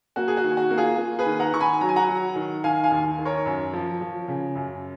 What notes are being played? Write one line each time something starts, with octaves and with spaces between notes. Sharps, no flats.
A#3 F#4
G#4
F#4
D#3
F#4
A#3
F4 G#4
A#3
G#4 B4
D#3
F#5 A#5
D#3 C#6
G#5 B5
F#3 A#5
G#5
F#5 A#5
F#3
D#3
D#3 F5 G#5
F5 G#5
D#2
D#3
A#4 C#5
F#2
F3
F3
C#3
F#2